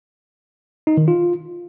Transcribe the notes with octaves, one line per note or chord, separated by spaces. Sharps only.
D#4
D#3
F4